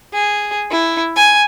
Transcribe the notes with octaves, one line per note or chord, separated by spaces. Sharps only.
G#4
E4
G#5